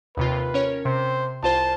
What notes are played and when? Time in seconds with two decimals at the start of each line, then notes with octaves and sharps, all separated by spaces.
0.17 D#2 C3 F4 B4
0.54 C#4 A#4 C#5
0.85 C3 C5
1.43 C2 F4 C5 A5